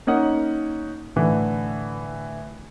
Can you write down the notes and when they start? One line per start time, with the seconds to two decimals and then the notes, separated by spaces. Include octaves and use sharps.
0.07 A#3 C#4 D#4 F#5
1.16 A2 D3 E3